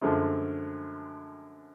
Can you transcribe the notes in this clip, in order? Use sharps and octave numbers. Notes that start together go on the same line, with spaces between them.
F#2 D3 F3 G#3 A3